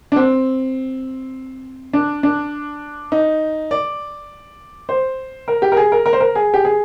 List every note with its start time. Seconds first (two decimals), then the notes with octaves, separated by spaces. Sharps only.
0.12 D4
0.16 C4
1.93 D4
2.23 D4
3.12 D#4
3.71 D5
4.89 C5
5.48 A#4
5.62 G4
5.72 A#4
5.77 G#4
5.92 A#4
6.06 A#4
6.13 C5
6.20 A#4
6.35 G#4
6.54 G4
6.65 G#4